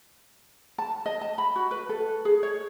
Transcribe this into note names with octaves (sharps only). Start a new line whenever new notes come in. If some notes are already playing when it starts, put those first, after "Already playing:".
A5
D#5
A5
B5
F#4
B4
A4
G#4
C#5